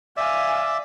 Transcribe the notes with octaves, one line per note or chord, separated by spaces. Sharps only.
D5 E5 F5 G#5